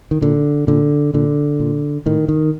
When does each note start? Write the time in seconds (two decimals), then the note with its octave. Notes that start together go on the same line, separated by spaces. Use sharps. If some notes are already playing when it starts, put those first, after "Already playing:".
0.11 D#3
0.22 A#2 D3
0.67 A#2 D3
1.14 A#2 D3
1.60 A#2
2.06 A2 D#3
2.29 D#3